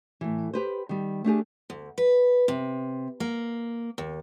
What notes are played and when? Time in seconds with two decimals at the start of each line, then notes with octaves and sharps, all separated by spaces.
0.21 A2 E3
0.54 G4 B4 C5
0.89 D#3 G3
1.24 A3 D4 G4 G#4
1.70 D2
1.98 B4
2.48 C3
3.20 A#3
3.98 D#2